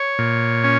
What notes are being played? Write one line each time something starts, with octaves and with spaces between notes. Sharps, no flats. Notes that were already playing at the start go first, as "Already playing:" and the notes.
Already playing: C#5
A#2
C#4